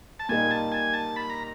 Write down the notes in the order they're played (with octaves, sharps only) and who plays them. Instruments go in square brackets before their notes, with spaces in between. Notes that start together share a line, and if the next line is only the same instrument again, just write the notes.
[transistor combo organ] A5
[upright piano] A#2 G3 A#3 D#4 [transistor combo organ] G#5
[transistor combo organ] A5
G#5
A5
B5
A#5